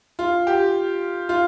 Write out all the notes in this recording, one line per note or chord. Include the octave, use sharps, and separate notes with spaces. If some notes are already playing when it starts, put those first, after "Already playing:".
F4
G4
F4